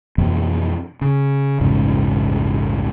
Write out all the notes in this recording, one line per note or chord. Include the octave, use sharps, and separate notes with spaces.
F2 B2 E3 A#3
C#3
A#1 E2 G#2 C#3